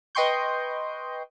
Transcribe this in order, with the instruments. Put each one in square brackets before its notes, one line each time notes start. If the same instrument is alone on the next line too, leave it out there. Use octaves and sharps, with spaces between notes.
[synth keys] B4 D#5 G5 C6 C#6 G6